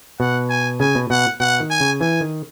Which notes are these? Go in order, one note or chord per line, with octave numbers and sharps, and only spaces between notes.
B2 F#5
G#5
C#3 G#5
B2
B2 F#5
B2 F#5
D#3
G#5
C#3
E3 G#5
D#3